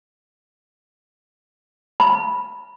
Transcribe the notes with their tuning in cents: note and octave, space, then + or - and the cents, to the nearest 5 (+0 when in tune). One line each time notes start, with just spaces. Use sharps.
B5 -15